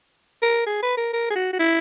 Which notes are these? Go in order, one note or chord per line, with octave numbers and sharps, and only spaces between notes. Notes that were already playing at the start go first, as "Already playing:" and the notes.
A#4
G#4
B4
A#4
A#4
G#4
F#4
F#4
E4